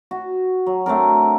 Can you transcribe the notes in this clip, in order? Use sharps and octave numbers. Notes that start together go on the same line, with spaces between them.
F#4
F#3
A3 C4 D4 A#4